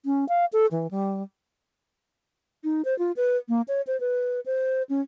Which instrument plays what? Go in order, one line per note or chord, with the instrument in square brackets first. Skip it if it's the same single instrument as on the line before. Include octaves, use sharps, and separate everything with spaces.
[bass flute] C#4
F5
A4
E3
G3
[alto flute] D#4
C5
F4
B4
A#3
C#5
C5
B4
C5
C#4